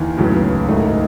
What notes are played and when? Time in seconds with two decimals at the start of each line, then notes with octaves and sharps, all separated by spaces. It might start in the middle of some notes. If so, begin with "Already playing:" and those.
Already playing: D#2 D#3 E3
0.17 C#2 A2 C#3 F#3 B3
0.68 G#2 D#3 A3 D#4